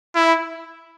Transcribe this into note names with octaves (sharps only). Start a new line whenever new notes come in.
E4